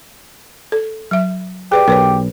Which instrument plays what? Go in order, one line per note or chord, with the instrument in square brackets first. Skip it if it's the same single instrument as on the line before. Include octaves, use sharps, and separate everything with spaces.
[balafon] A4
F#3 E5
[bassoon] G4 [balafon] G#4 B4 D5
[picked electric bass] B1 [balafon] A#4 B4 C#5